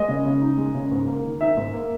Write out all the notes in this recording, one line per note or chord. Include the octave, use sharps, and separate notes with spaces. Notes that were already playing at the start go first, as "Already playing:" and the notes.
Already playing: G#3 D#5
C#3
C#3
D#4
G#3
C#3
G#2
A#3
D#3
D#4 E5
G#2
A#3